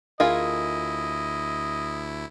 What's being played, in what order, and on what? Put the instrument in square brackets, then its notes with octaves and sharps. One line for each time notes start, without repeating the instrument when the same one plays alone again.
[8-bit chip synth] D2 E4 [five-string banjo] F4 G#4 A#4 [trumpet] D#5